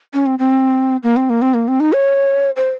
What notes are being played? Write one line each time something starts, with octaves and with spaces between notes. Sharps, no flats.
C#4
C4
C4
A#3
C4
A#3
C4
A#3
C4
D#4
C#5
C5